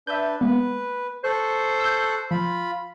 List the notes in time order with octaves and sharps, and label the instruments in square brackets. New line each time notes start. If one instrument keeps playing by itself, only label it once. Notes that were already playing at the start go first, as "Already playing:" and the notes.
[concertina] D4 B4 [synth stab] E5 G6
[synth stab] G#3 A#3 B3 [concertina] B4
[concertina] A4 C#6 F#6 [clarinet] C5
[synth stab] E6 G6
[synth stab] F3 [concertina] F4 B5